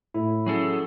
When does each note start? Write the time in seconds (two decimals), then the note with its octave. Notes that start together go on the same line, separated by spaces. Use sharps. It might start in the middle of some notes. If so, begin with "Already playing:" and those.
0.14 A2 E4
0.46 F#3 C#4 G#4 A4